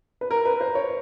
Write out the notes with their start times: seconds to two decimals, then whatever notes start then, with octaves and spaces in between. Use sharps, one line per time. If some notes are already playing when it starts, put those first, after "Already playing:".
0.21 B4
0.31 A#4
0.45 B4
0.61 C5
0.75 C#5